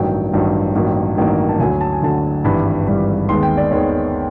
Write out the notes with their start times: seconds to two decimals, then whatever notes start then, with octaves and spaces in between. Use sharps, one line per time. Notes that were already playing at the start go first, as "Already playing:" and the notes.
Already playing: A1 G2 D#3 F#3 G5
0.33 A1 G2 D#3 F#3
0.75 A1 G2 D#3 F#3 A#3
1.18 A1 G2 D#3 F#3 A#3
1.49 A5
1.60 D2 D3 F#3 G#5
1.81 A5
1.92 G#5
2.03 D2 D3 F#3 A5
2.44 G#1 G2 E3 G3 B5
2.87 G#1 G2 E3 G3
3.29 D#2 D#3 G#3 B3 C6
3.43 G5
3.57 D5
3.71 D#2 D#3 G#3 B3 C#5